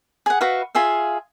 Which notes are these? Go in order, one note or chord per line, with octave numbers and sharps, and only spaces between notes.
G#4 F#5
F#4 B4 E5 F5
F4 G#4 E5 F5